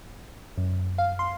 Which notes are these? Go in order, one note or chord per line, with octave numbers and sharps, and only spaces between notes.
F#2
F5
C6